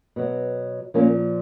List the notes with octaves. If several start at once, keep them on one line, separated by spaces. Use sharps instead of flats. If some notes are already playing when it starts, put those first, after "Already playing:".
B2 F#3
A#2 F3 A#3 C#4